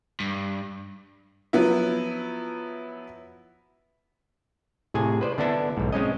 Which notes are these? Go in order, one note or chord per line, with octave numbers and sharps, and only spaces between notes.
G2
F3 F#3 B3 E4
A2 C3 G#4 G#5
B4 C5 D5
D3 B3 D4 E4 A4
B1 G#2
G#3 C4 C#4 D#5